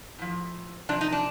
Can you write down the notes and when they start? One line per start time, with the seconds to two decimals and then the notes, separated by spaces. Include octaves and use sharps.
0.19 A2 F3
0.89 C3 F3 D4
1.01 D#4
1.12 D4